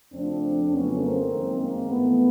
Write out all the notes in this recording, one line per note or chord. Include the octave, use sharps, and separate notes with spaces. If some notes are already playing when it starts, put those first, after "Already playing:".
F2 C#3 F3 A3 C4 D4
F2 C#3 F#3 A3 B3 C#4
A#3 C4
F#2 D#3 G#3
A#3
G#2 E3 G#3 A3 B3